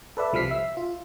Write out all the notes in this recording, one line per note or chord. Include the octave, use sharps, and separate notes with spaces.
A4 B4 D5 E5
C2 F3 G3 F6 B6 C7
E5
F4